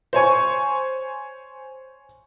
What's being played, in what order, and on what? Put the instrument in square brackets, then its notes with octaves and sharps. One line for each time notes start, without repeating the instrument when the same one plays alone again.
[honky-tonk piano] C5 C#5 G#5 C#6